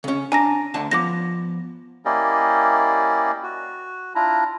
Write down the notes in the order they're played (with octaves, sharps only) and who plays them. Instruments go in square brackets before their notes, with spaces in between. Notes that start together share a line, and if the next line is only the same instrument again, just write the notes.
[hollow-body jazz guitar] C#3 C#4
[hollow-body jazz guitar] D4 [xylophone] G#5 A#5 A#6
[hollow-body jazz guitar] D2 D3 A5
[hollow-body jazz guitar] F3 B3 [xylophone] D6 A#6
[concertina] A#3 C#4 E4 G4 D5 D#5
F#4
D4 E4 F4 A#5